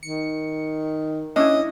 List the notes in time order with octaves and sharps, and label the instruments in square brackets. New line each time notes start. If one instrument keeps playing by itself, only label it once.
[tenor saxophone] D#3 [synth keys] C#7
[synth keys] C#4 [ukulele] D4 E4 [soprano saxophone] D#5